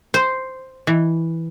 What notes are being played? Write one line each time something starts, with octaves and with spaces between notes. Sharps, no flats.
C5
E3